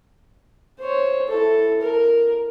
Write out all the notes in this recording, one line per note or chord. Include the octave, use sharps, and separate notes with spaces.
C5 C#5
E4 A4
A#4